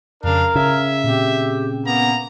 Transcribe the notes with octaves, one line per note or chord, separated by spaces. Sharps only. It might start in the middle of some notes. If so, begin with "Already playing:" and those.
F2 C#3 D4 A#4 F5
C#3 E5 G#6
A#2 C4 G4
A#3 B3 A#5